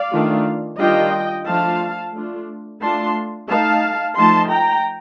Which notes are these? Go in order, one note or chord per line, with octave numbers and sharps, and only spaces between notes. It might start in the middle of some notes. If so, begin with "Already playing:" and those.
Already playing: D5 F5
D#3 A3 D4 F4
D#3 G3 D4 F4 D#5 G5
F3 A3 D4 F4 F5 A5
A3 D4 F4
A3 D4 F4 A5 C6
A3 D#4 F5 A5
F3 A3 D#4 A5 C6
G5 A#5